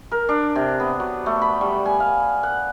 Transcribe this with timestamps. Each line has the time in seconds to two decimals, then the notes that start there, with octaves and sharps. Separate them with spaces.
0.12 A#4
0.29 D4
0.55 C3
0.80 B3
1.00 F#3
1.26 A3
1.42 B5
1.61 G3
1.85 G#5
2.00 F5
2.43 F#5